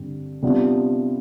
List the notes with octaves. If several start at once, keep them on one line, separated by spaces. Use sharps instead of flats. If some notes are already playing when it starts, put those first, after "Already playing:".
Already playing: G2 D3 C4
C3 G3 B3 D4 F4